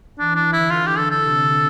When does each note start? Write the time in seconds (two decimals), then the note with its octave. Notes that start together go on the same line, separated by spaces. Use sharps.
0.19 E3 D4
0.35 D4
0.52 D3 E4
0.70 F4
0.87 G4
0.98 A4
1.10 A4
1.21 C3